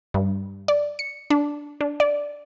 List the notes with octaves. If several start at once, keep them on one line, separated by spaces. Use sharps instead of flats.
G2
D5
C#7
D4
D4
D5